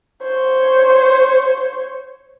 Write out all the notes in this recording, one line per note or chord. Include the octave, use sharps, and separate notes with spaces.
C5 C#5